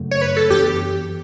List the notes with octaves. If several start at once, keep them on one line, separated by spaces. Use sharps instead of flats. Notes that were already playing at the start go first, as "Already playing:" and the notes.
Already playing: F#2 C#3 F#3 A3
C#5
B4
A4
F#2 E3 B3 D4 G4